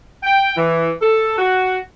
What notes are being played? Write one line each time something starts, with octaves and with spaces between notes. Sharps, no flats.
G5
E3
A4
F#4